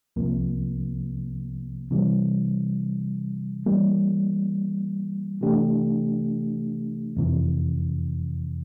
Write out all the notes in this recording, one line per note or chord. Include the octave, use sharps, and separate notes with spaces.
C2 C3 F3 A#3
C3 E3 G3
E3 G3 A#3
C3 E3 A3 D4 G4
F2 C3 E3